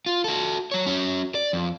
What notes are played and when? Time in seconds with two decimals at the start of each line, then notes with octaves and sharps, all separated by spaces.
0.06 F4
0.24 F#4 A4
0.72 F#3 C#5
0.86 C#4 F#4
1.35 D5
1.53 F2